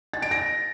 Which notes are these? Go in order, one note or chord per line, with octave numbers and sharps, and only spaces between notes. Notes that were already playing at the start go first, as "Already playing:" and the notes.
A6
D7
A#6